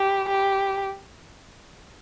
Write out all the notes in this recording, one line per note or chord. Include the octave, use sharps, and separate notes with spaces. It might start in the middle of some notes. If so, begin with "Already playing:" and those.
Already playing: G4
G4